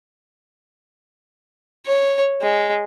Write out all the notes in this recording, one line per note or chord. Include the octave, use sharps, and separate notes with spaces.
C#5
G#3